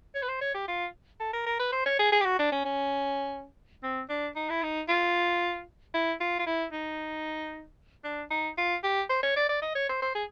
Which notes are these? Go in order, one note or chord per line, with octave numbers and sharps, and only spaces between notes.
C#5
B4
C5
C#5
G4
F4
A4
A#4
A#4
B4
C5
C#5
G#4
G#4
G4
F#4
D4
C#4
C#4
C4
D4
D#4
E4
D#4
F4
E4
F4
F4
E4
D#4
D4
D#4
F4
G4
C5
C#5
D5
D5
D#5
C#5
C5
C5
G#4